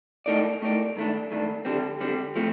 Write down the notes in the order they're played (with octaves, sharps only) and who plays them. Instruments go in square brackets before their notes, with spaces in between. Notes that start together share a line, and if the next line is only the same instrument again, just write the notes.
[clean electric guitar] A2 A3 D#4 A#4 D5
A2 A3 D#4 A#4 D5
G2 D#3 A3 D4
G2 D#3 A3 D4
D3 G3 C4
D3 G3 C4
F3 A3 C4